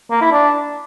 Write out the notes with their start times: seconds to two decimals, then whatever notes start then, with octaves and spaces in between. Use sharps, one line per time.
0.10 A#3
0.21 E4
0.32 D4